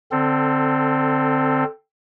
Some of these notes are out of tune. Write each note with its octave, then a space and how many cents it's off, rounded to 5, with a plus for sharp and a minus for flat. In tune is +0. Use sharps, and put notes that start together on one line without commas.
D3 +0 C4 +0 A4 +25